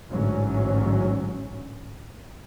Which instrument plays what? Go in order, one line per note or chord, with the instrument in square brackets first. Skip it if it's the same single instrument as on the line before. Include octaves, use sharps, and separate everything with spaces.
[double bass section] A1 G#2 D3 F#3 C#4